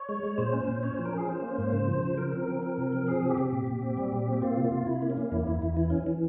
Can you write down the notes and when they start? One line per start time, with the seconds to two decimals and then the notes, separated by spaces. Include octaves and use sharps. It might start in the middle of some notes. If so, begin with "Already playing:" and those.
Already playing: C#5
0.09 G#3
0.23 G#3
0.38 A#2 C5
0.53 C#4
0.61 C5
0.68 A#2
0.83 C#4 C#5
0.94 F3 C5
1.05 A#4
1.13 C#4 G#4
1.28 C#4 C5
1.42 A#3
1.58 G#2
1.73 C#3
1.88 F3
2.03 C#3
2.17 F3 A#4
2.33 C4
2.48 F3
2.63 C4
2.78 C3
2.93 F3
3.07 C4 G#4
3.23 C3
3.30 G4
3.38 C3
3.52 A#2
3.67 A#2
3.82 C4
3.97 G3
4.12 A#2
4.28 C4
4.33 G4
4.42 A#3 F4
4.57 C3
4.64 F4
4.72 C3
4.87 C3 E4
5.02 A#3
5.10 C#4
5.17 A#3
5.32 E2 E4
5.47 E2 E4
5.62 E2 E4
5.76 E3 E4
5.90 E3 C#4
6.07 E3